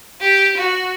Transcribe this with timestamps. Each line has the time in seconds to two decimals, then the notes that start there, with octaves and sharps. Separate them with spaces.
0.21 G4
0.57 F#4